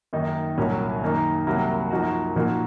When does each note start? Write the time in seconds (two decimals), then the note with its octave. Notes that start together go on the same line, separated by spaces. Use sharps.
0.13 F#2 D#3 A#3 D#4
0.57 C2 A#2 F#3 C#4
1.02 F#2 D#3 A#3 D#4
1.47 C2 C3 F#3 A#3
1.90 F#2 F3 A#3 D#4 F#4
2.36 A#2 F3 A#3 D#4 F#4